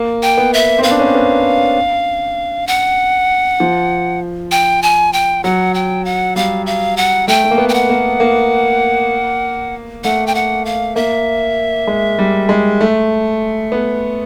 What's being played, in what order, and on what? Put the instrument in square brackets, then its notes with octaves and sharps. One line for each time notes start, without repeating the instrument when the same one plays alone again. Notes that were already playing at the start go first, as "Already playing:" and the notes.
Already playing: [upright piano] A#3
[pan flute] G5
[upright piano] B3
[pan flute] E5
[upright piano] C4
[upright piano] B3 [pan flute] F5
[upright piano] D4
C#4
C4
B3
[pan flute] F#5
[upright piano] F3
[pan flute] G5
G#5
G5
[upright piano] F#3 [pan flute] F#5
[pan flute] G5
F#5
[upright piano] G3 [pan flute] F5
[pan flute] F5
F#5
[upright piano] A3 [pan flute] G5
[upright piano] A3
A#3
B3
[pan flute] G5
F#5
[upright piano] A#3
A#3
[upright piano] A3 [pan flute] F#5
[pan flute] G5
F#5
F5
[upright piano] A#3 [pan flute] E5
[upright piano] G#3
G3
G#3
A3
B3